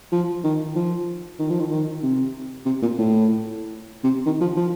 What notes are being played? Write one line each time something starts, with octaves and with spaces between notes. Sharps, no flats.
F3
D#3
F3
D#3
F3
D#3
D#3
C3
C3
A#2
A2
C3
D#3
F3
F3